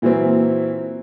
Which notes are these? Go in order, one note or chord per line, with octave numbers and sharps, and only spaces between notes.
A#2 E3 F#3 A#3 C4